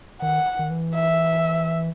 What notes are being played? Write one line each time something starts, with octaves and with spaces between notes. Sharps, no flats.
D#3 F#5
D#3
E3
E5